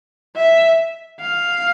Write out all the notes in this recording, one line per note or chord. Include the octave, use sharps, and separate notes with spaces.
E5
F5